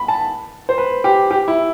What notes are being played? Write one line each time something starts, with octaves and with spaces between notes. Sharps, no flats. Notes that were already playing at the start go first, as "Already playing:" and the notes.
Already playing: B5
A5
C5
B4
G4
G4
E4